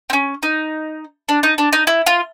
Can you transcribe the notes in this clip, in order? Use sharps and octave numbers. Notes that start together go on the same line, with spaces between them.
C4
C#4
D#4
D4
D#4
D4
D#4
E4
F4